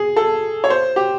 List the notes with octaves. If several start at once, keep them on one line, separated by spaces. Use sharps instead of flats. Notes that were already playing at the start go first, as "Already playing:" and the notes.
Already playing: G#4
A4
C#5
C5
G4